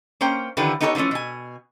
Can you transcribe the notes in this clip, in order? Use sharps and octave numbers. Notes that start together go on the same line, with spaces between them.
A#3 C#4 C5 G5
D3 D#3 F3 E4 G4 B4
B3 D#4 G4 A4 B4 C#5
D3 E3 F3 A3 C#4
B2 G#5